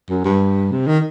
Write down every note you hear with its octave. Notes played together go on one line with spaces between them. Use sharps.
F#2
G2
C3
D#3